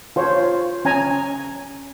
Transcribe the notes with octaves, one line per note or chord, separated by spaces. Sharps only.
F4 C5 C#5
C#4 G#5 A#5